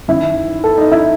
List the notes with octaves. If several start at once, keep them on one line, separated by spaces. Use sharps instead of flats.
F#2 D#3 E4
A4
D#4
E4